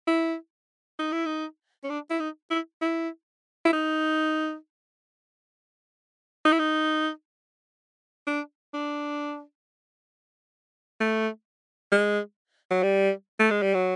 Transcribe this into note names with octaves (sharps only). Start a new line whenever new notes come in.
E4
D#4
E4
D#4
C#4
D4
E4
D#4
E4
E4
E4
D#4
D#4
E4
D#4
D4
D4
A3
G#3
F#3
G3
A3
G#3
G3
F#3